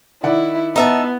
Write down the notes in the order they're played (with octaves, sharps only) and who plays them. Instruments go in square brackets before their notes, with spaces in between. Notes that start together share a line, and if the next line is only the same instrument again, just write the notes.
[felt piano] D#3 D5 F#5 [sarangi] E4
[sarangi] B3 [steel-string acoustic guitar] D#4 E5 A5